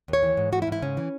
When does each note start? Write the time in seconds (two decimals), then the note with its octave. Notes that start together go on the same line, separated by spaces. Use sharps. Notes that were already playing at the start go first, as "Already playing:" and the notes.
0.08 D#2
0.13 C#5
0.23 E3
0.37 G#2
0.52 E3 F#4
0.62 E4
0.67 G#2
0.72 E4
0.82 C#3 C#4
0.97 E3